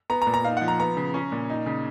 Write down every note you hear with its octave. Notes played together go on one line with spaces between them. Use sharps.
B3 A#5
A#5
A#2
A#5
D#4 F5
F#5
F3
A#5
B3 A#5
C#3
C#4
A#2
D#4
C#3